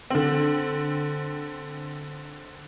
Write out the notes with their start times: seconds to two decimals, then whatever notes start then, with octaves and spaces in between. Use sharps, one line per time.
0.10 D3 C4